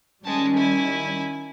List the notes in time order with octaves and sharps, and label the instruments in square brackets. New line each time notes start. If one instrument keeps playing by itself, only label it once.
[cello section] D#3 G3 C#4 [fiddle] G#3 A5
[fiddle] E4 G#5